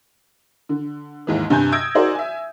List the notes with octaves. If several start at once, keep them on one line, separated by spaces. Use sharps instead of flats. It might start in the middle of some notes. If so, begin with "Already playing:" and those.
D3
D#2 G#2 E3
G2 C3 G#5 G6
D#6 E6 G6 G#6 A#6 D7
D#4 F#4 G#4 A#4 C5 D5
E5 G#5